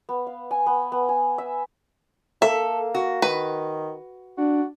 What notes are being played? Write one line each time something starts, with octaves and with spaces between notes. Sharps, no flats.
B3
F5
G#5
B3
B3
G#5
E5
A#3 A4 E5
F#4
D#3 B4
D4 F#4